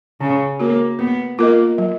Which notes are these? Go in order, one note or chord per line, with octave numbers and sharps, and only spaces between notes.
C#3 C#4
A#3 F#4 A#4 C#5
A#3 B3
A#3 F4 A#4 D#5
F#3